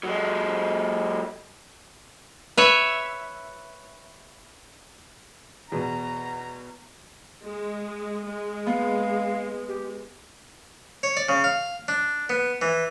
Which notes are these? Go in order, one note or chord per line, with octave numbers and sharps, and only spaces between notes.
F#3 G#3
B4 C#5 E5
E2 B2 A#5
G#3
G#3
B3 F5
G4
C#5
D5
C#3
F5
D4
B3
E3